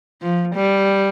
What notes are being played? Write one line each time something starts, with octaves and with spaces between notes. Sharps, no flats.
F3
G3